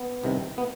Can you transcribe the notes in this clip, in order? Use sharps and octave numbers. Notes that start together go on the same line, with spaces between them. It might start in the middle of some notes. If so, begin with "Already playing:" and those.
Already playing: B3
C2 C3 D#3
B3